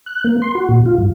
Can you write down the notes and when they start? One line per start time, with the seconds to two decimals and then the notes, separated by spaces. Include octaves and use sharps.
0.06 F#6
0.24 A#3
0.42 C6
0.55 F#4
0.69 A#2
0.86 F4
0.98 G2